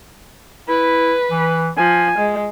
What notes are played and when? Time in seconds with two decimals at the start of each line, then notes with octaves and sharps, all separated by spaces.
0.69 E4 B4
1.31 E3
1.77 F3 G#5
2.18 G#3